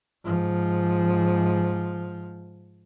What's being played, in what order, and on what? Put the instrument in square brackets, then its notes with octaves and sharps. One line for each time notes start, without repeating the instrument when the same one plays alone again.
[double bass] G#2 F3